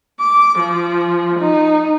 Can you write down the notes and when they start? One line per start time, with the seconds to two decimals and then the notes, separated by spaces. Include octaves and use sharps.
0.20 D6
0.59 F3
1.39 D#4